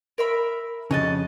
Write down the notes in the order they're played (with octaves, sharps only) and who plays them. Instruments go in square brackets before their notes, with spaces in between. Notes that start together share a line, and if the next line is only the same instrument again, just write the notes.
[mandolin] A#4 E5 B5
[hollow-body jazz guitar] F2 C#3 [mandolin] F#4 D#5 A5